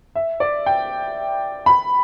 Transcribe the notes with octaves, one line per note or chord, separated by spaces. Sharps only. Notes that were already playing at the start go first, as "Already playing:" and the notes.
E5
D5
G5
B5